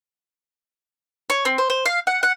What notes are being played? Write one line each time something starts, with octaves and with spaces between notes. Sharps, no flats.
C#5
C4
C5
C5
F5
F#5
F#5